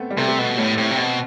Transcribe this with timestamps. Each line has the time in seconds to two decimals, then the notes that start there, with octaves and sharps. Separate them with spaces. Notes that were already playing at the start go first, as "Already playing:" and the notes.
Already playing: A3 B3 C4
0.10 G3
0.18 C3 A3
0.28 A3
0.38 B2 B3
0.57 A2 A3
0.77 A2 C4
0.91 C3
0.97 B2 C4